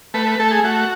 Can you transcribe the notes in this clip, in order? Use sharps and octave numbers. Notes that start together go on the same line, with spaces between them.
A3 B4
B4
A3 A4
G#4
A3 F#4